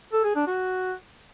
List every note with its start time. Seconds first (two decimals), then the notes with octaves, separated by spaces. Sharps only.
0.13 A4
0.24 G#4
0.36 D4
0.47 F#4